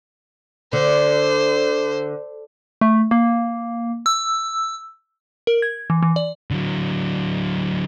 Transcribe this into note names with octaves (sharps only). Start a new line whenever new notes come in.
D3 C5
A3
A#3
E6
A#4
G#6
E3
E3
D5
D3 F#3